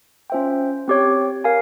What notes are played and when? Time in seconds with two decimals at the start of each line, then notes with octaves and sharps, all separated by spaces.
0.30 C#4 F4 C5 E5 G5
0.88 C4 G4 C#5
1.44 A#4 F5 G#5